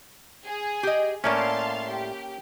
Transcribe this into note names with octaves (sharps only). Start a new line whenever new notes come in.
G#4
G4 D#5
A2 A3 A#3 C#4 D5 F5 A5 C6
G4